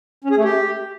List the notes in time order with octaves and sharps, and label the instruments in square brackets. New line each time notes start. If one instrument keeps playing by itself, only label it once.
[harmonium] C#4
G#4
A3
G4